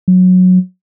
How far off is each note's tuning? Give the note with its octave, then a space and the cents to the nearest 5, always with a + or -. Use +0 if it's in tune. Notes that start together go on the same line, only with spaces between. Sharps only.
F#3 -15